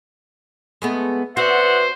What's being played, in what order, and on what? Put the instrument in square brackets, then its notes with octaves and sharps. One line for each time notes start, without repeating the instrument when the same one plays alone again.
[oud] G#3 A3 B3
[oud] C4 F#4 [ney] B4 [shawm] C5 [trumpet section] D5 E5 F#5